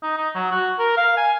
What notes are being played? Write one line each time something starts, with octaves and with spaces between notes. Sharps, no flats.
D#4
D#4
F#3
F#4
A#4
F5
G#5